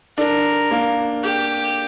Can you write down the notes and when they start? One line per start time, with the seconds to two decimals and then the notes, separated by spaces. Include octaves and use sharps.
0.17 D4 A#4
0.71 A#3
1.23 G4